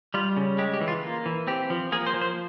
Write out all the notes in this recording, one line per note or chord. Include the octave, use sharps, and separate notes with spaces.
G3 F4
C#3
G#3 G4
G4
E3
F4
A#3 F4
E3
C4 G4
F3
A#3 G#4
C5
F3
C5